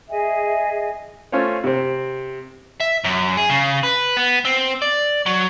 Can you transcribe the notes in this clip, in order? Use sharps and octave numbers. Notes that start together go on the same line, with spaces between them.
G#4 D#5 E5 G#5
A3 C#4 F4 C5 C#5
C3 C4
E5
F#2
G#4
C#3
B4
B3
C4
D5
F#3